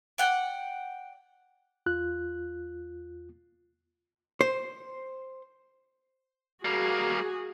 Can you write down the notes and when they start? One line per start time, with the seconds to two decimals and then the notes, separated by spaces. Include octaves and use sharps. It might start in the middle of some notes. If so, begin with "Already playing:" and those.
0.18 D5 F#5 G5
1.86 E2 F4 F#6
4.41 C5
6.65 G3 A#3 F#4 G#4